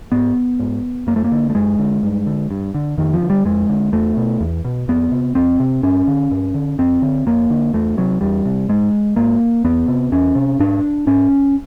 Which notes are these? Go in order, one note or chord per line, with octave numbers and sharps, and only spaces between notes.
G#2 B3
G#2
F#2 A#3
A3
A#3
D3
A3
F#2 G#3
D3
G2
D3
G2
D3
F2 D#3
F3
D3
G3
F2 G#3
D3
E2 A3
B2
E2
B2
F2 B3
C3
F2 C4
C3
G2 C#4
D3
G2
D3
F2 C4
D3
F2 A#3
D3
E2 A3
C3 F#3
E2 G3
C3
G#2 G#3
G#2 A#3
E2 B3
C3
E2 C#4
C3
G#2 D4
G#2 C#4